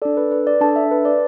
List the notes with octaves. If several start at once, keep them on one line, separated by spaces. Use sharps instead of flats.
D4 A4 D5
B4
B4
D5
D4 A4 A5
E5
B4
D5